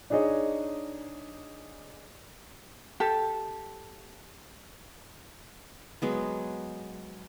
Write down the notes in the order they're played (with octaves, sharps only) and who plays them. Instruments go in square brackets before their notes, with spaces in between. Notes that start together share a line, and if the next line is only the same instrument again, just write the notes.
[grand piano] D4 D#4 G#4 C#5 D#5
[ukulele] G4 A4
[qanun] F#3 G#3 B3